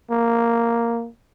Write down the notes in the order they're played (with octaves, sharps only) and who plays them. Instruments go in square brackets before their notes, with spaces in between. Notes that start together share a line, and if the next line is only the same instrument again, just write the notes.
[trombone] A#3